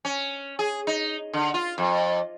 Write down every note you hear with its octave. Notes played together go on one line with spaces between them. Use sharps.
C#4
G#4
D#4
D3
F4
F2